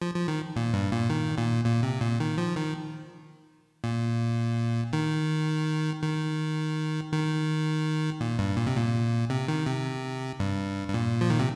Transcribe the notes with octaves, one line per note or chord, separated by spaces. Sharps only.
F3
F3
D#3
A#2
G2
A#2
D#3
A#2
A#2
C3
A#2
D#3
F3
D#3
A#2
D#3
D#3
D#3
A#2
G2
A#2
C3
A#2
C3
D#3
C3
G2
G2
A#2
F3
D#3
C3